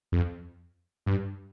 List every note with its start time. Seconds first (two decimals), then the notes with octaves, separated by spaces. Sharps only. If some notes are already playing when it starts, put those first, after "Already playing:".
0.12 F2
1.06 G2